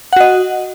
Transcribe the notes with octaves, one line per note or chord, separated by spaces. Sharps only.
F#4 D#5 F#5